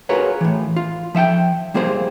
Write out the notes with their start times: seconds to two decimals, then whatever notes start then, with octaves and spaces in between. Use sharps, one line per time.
0.09 F4 F#4 G#4 A#4 B4 C#5
0.41 A2 E3
0.76 F4
1.15 F3 E5 F#5 G5
1.74 G3 A#3 F4 G#4 C5